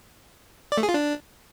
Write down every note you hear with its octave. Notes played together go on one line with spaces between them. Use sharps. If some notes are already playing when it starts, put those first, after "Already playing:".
D5
A3
G#4
F4
D4